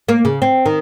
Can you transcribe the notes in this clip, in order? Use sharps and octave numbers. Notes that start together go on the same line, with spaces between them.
A#3
C#3
C4
D#3